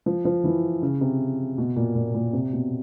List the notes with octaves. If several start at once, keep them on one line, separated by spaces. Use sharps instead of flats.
F3
F3
E3
C#3
C3
B2
A#2
A#2
A#2
C3
B2